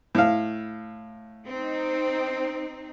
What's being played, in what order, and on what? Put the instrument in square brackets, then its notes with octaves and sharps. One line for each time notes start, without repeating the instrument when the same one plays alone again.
[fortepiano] A2 F5
[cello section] C4 D#4